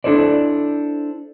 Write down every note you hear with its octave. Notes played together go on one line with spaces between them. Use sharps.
D4 E4 A4 C5 D5